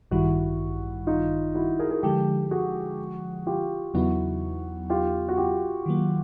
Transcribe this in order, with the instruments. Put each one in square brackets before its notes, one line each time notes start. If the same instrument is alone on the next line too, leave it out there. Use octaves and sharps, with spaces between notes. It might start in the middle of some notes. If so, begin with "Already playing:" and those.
[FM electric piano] A1 G2 D#3 G3 [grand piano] E4 F#4
[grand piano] D#4 F4
E4 F#4
G#4 A#4
G#4 A#4
[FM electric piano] D3 F3 G#3 [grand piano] G4 A4
[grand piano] F#4 G#4
F4 G4
[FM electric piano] E2 C#3 F#3 B3 D#4 [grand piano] E4 F#4
[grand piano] F4 G4
F#4
F4 G4
[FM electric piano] D#3 F#3 A#3